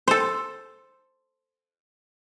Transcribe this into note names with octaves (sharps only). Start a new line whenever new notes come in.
A4 C5